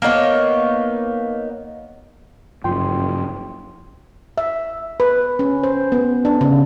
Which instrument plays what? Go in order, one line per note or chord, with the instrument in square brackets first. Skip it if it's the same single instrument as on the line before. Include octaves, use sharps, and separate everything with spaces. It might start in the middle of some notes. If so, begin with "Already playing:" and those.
[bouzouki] A#3 B3 D#4 C#5
[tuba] F#1 [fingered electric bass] G2 F3 [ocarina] F4 [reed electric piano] G5 C6
[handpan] E5
B4
C#4
C5
B3
D4
C#3